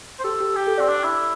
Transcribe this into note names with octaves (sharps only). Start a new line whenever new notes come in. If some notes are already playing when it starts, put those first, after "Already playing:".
C5
G4 A4
G4
G4
A4
C4 D5
D4
E4